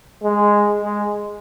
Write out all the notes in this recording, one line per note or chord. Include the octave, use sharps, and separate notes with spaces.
G#3
G#3